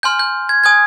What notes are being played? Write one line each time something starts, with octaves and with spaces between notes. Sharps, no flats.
G#5 C6 F6 G6
G6
G#6
G#5 D#6 G6 G#6